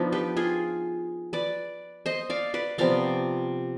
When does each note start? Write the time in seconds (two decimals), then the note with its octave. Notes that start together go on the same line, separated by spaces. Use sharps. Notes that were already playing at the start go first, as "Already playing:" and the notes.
Already playing: F3 B3 D4 D#4
0.12 G4 B4
0.37 F4 G#4
1.33 B4 D5
2.06 C5 D#5
2.30 D5 F5
2.54 B4 D5
2.78 C3 F3 B3 D5 F5